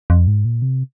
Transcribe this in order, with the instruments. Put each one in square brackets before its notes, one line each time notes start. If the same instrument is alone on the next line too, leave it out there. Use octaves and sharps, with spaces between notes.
[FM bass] F2
G#2
A#2
C3